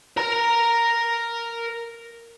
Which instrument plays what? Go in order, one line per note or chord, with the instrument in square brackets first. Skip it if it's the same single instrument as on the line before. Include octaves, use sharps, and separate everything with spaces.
[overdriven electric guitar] A#4 A#5